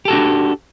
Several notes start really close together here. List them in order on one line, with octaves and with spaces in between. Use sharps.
G4 A4 F#4 D4